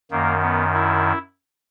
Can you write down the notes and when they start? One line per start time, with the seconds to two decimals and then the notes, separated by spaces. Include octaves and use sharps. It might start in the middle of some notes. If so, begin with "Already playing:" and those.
0.11 F#2 D#3 A#3
0.42 B3
0.74 E4